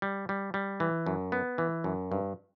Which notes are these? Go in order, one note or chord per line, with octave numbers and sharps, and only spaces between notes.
G3
G3
G3
E3
F#2
B3
E3
F#2
G2